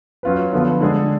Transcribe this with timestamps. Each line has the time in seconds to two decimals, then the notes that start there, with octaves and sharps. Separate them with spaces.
0.23 F#3 C#4 F4 B4
0.53 D3 F3 B3 F4
0.81 D3 G#3 D4 G#4